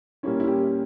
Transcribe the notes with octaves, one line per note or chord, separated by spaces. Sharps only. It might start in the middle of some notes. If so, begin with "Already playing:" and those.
A#2 G3 A#3 C#4 E4
E4
G4